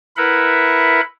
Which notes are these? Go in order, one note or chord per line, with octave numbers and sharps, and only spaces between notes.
E4 A#4 B4 E5 F#5 B5